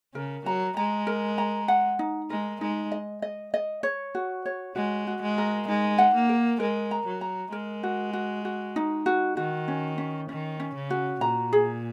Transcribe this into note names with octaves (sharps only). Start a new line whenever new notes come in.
C#3 A#4
F#3 A#5
G#3 A#5
A#4
A#5
F#5
D#4
G#3 A#4
G#3 D#4
D#5
D#5
D#5
C#5
F#4
C#5
G#3 F#4
F#4
G#3
A#4
G#3 D#4
F#5
A#3
A#4
G#3 A#4
A#5
F#3
A#5
G#3 A#4
F#4
F#4
F#4
D#4
F#4
D#3 F#4
C#4
C#4
D#3 C#4
C#4
C#3
F#4
A#2 A#5
G#4